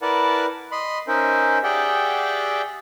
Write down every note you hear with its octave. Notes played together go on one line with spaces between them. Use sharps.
E4 A#4 B4 D5 F#5 A5
D#5 B5 C6
C#4 D#4 A#4 C5 E5
G4 G#4 D5 E5 F#5 G5